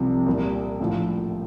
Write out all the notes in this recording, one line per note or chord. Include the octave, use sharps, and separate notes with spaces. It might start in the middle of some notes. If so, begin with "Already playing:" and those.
Already playing: C2 C3 F3
C2 A#2 G3
A#1 A2 F3